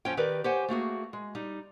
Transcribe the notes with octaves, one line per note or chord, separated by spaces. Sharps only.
F2 F3 C#4 C5 C#5 G5
D#3 G4 A#4 B4 D5
G4 C5 C#5 F#5 G#5
A3 A#3 F#4 G#4
G#3
G3 D#4